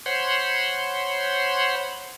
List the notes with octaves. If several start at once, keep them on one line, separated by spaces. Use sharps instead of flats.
C5 C#5 F#5 B5 C6